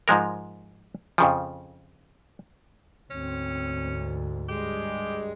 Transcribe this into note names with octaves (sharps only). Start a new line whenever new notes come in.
G#2 F3 G#3 A#4
F2 C#3 F3
D2 G#2 C4 C#4
G2 G3 G#3 G4